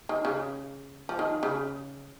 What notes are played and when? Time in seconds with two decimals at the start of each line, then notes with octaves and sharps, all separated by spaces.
0.09 D#3
0.25 C#3
1.09 F3
1.19 D#3
1.43 C#3